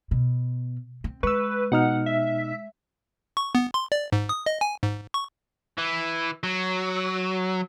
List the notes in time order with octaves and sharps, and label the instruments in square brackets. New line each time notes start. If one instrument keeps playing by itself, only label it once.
[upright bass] B2
C4
[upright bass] G#3 [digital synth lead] B4 [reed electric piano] C#6 E6
[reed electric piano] B2 D#4 F6 [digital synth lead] F#5
[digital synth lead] E5
[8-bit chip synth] C#6
B3
C6
D5
G#2
D#6
D#5
G#5
G#2
C#6
[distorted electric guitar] E3
F#3